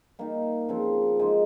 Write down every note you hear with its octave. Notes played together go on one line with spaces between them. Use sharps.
G3 A#3 D#4 G4
C#3 F3 C4
G#3 D#4 G4